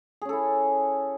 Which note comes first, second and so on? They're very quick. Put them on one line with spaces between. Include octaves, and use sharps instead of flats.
G#4 C#4 A4 E4